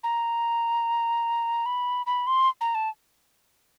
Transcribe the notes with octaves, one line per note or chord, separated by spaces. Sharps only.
A#5
B5
B5
C6
A#5
A5